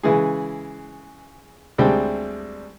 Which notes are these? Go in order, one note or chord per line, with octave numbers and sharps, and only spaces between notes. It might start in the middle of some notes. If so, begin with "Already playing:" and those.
C#3 E3 G#3 G#4
D2 G3 G#3 C4 D4 G5